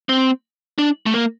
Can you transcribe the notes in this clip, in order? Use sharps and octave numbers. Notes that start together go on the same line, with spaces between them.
C4
D4
A3
A#3